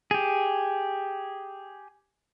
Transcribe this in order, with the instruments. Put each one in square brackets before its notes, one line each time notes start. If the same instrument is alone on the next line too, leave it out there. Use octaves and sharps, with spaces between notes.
[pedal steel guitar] G4 G#4